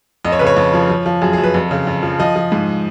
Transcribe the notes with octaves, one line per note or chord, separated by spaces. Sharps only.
F2 D#5
C#5
C#3 B4
C#5
F2
F3
F3
F3
F#2 G#4
G#4
F#2
B4
F2
C#3
F2
F3
F3 D#5
F3
G#2